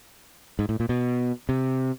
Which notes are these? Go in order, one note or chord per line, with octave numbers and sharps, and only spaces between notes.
G#2
A2
A#2
B2
C3